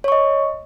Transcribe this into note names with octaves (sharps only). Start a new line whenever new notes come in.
C#5 D#5 C#6